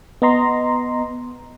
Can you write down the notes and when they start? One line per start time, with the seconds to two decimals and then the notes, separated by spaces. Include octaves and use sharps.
0.22 B3 D#5 A#5 C6